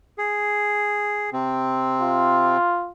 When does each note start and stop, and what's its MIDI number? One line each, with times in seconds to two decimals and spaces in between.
0.18 1.30 68
1.33 2.57 48
1.33 2.57 60
2.01 2.90 65